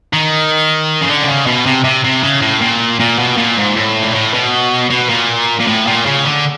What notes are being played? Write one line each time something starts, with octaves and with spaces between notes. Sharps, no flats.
D#3
C#3
D3
C3
C#3
B2
C3
C3
C3
C#3
A2
A#2
A#2
B2
A#2
G#2
A2
A#2
A2
B2
B2
A#2
A#2
A2
A#2
C#3
D3